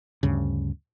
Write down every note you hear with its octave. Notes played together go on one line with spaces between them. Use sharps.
D2 G2 C#3